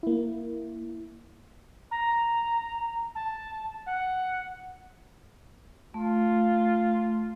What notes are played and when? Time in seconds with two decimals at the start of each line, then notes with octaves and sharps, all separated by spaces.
0.03 A#3 E4
1.91 A#5
3.15 A5
3.86 F#5
5.94 A3 F4